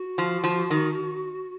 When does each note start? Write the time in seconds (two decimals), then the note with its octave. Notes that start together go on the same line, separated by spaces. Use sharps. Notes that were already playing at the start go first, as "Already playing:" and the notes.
Already playing: F#4
0.18 F3
0.44 F3
0.70 D#3